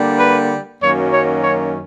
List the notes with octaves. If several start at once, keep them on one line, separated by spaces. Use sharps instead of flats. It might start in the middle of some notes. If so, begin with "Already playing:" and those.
Already playing: D3 G3 A#3 D4
B4
F#2 D#3 F#3 A#3 C#4 C#5
C#5
C#5